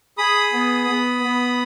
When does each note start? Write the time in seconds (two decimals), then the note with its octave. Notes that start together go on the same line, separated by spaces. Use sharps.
0.18 G#4 B5 D#6
0.53 B3
0.88 B3
1.23 B3